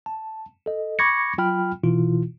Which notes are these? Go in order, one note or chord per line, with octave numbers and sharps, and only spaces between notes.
A5
A4 D#5
B5 C#6 D6 G#6 A#6 C#7
F#3 F4 G5 B5 F6
B2 E3 E4 F4